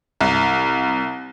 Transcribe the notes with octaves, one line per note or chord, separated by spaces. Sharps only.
C2